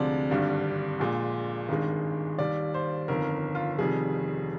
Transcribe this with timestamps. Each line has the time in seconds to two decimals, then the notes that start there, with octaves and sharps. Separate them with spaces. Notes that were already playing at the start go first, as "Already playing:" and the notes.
Already playing: D2 C3 F3 G#3 D5
0.30 G#1 G2 D3 G3
1.00 A#1 A#2 G#3
1.69 G#1 G2 D#3 G#3
2.38 D#2 D#3 G3 D5
2.74 C5
3.08 G1 F2 D#3 A#4
3.55 F4
3.78 F1 F2 D#3 G3 G#4